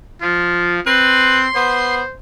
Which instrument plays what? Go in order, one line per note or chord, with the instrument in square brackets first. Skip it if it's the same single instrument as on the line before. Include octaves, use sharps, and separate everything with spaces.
[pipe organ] F3 [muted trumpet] F4
[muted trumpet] C4 [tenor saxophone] B4 [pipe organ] C6
[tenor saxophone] B3 [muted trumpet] C5